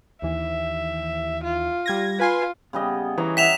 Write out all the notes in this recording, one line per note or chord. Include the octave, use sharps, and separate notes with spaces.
D#2 E3 E5
F4
G3 G#6 A#6
F4 B4 G#5 C6
C#3 G3 B3 D#5
E3 D#4 C#5 A#5
E5 F#5 G5 B6 E7 F7